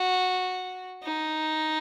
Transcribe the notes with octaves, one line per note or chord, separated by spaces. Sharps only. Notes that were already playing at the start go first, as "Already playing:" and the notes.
Already playing: F#4
D#4